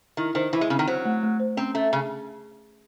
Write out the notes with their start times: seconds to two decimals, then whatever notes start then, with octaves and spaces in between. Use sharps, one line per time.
0.17 D#3 E4
0.35 D#3 C5
0.53 E3 E4
0.61 G#3
0.70 C#3 C4
0.79 D#3
0.87 F#3 C5
1.05 A3
1.23 A3
1.40 C5
1.57 C4 C#4
1.75 A3 C#4
1.93 C#3 G#4